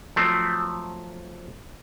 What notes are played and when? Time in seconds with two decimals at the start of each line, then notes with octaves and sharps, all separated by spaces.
0.16 F3 F#3 A3 C4